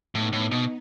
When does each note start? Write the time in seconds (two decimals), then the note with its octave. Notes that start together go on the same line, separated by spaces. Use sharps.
0.15 A2 B3 D#4
0.33 A2
0.51 B2